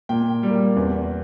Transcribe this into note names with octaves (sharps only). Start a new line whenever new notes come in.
A#2 G5
G3 A#3
E2